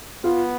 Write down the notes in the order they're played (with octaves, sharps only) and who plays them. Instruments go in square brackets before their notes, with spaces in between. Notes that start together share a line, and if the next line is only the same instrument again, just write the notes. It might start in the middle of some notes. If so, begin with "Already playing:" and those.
[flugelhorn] B3 [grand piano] F4